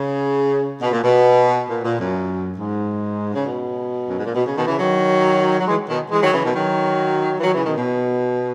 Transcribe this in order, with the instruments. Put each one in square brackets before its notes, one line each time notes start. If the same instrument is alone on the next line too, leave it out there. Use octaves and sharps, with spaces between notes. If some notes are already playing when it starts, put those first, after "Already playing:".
Already playing: [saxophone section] C#3
B2
A#2
B2
A#2
A#2
F#2
G#2
C#3
B2
F#2
G#2
A#2
B2
C#3
B2 D#3
C#3 E3
D#3 F#3
F#3
E3 G#3
B2 D#3
E3 G#3
D#3 F#3
C#3 E3
B2 D#3
D#3 F#3
E3
D#3 F#3
C#3 E3
B2 D#3
B2